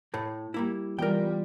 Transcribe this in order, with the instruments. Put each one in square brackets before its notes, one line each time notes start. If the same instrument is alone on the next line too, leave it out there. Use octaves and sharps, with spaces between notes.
[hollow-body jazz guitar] A2 A3
G3 A#3 E4
[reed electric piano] E3 B3 F4 [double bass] G3 [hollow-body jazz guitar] A#4 G5